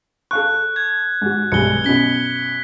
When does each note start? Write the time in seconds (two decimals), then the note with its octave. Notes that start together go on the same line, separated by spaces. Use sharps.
0.31 A4 F5 C#6 F#6
0.76 G#6
1.22 G#2 F#4
1.52 B1 G3 G#3 C#7 G7
1.84 F#2 B2 B6 G7